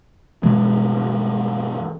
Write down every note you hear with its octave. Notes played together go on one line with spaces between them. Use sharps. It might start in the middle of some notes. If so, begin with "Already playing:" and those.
G2 B2 E3 G#3